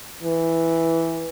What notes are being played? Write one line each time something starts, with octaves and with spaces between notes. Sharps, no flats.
E3